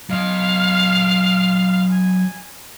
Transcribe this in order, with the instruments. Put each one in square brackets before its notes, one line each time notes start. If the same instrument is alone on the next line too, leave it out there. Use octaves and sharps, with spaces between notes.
[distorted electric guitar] F#3 D#5 [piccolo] F5
[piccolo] G#5